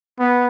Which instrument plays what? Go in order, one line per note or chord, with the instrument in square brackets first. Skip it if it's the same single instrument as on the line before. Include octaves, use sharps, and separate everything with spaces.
[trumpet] B3